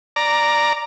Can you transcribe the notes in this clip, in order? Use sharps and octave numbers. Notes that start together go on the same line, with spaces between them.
D5 A#5